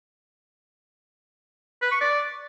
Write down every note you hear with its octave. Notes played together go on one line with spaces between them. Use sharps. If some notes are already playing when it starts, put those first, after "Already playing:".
B4
C#6
D5